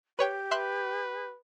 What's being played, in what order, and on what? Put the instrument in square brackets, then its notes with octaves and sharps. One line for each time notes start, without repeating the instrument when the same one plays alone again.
[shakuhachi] G4 [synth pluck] B4 C#5 G5
[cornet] B4 [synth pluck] E5 C6 F#6